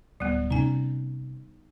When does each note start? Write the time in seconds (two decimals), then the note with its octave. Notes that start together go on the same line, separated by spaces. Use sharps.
0.20 D1 G3 B3
0.51 C3 C#4 D#4 G#5